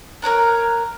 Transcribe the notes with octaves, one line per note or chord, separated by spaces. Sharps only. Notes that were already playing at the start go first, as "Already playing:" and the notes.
A#4 C#5 A#5 F#6